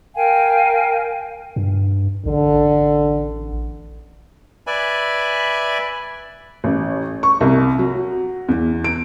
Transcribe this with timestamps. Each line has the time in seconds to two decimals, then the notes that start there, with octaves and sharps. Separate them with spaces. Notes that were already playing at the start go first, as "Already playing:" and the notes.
0.16 A#4 F5 G5 G#5
1.56 G2
2.26 A1 D3
4.67 B4 D5 E5 G#5 B5
6.64 A1
7.23 C#6
7.41 C2
7.79 F#3
8.49 E2
8.84 D7